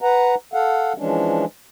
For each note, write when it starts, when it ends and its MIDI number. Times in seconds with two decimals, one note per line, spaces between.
0.01 0.35 71
0.01 0.35 78
0.01 0.35 82
0.53 0.93 69
0.53 0.93 77
0.53 0.93 78
0.98 1.45 52
0.98 1.45 53
0.98 1.45 56
0.98 1.45 61
0.98 1.45 62